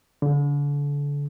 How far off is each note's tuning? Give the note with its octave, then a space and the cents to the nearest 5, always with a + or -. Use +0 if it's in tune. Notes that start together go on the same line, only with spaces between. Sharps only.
D3 -35